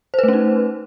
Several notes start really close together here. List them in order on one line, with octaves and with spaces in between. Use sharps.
C5 B4 A3 C#4 D#4